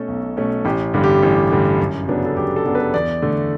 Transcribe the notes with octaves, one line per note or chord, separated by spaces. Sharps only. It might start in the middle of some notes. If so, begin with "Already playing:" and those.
Already playing: B2 A3 C#4 A4
B1
B2 A3 C#4
A1 G4
G2 D3 G3
G4
A1
G2 D3 G3
F#2
C#3 F#3 B3 D4
A4
F#2 G4
A4
C#3 F#3 B3 D4
B4
E2 D5
D3 A3